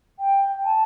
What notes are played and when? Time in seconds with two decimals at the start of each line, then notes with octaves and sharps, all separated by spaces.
0.19 G5
0.65 A5